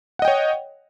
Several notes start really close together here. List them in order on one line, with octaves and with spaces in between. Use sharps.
F#5 D#5 G5 C#5